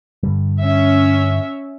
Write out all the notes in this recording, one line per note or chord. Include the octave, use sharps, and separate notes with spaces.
G2 D3 G3
C#4 E5